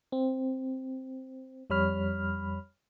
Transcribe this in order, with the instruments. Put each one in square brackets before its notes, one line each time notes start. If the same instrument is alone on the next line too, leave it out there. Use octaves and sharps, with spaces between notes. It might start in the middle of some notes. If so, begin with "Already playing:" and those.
[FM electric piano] C4
F2 G3 C#5 B5 F6